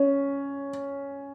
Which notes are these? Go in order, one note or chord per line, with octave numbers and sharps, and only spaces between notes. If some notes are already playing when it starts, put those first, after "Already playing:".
Already playing: C#4